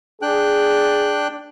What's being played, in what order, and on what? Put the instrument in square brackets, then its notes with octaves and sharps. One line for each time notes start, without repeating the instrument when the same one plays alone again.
[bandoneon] D4 G5 F#6 [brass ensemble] G#4